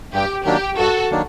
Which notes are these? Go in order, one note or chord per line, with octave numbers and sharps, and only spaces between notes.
G2 G4
D#3 F#3 A#3 D4 G4
G2 F#4 A4
D#3 F#3 A#3 D4